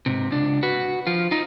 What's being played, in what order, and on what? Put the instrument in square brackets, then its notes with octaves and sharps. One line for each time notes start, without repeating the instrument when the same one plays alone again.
[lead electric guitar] G#2 C3
C#2 D4
F#4 B4
F3 F4
D#4 F4